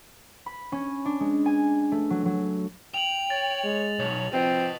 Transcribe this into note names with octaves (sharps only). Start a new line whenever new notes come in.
B5
C#4
D4
G#3
G#5
A3
F#3
F#3
G5 F7 F#7
C#5 A6
G#3
B1 C#5
F3 C4 B4 D#5